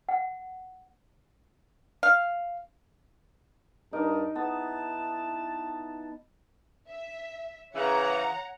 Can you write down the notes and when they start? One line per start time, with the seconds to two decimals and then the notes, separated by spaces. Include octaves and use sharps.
0.09 F#5
2.03 F5
3.93 G2 D#4 A#4 A5
4.35 B3 E4 A5
6.89 E5
7.74 C#3 E3 C#5 F#5 A#5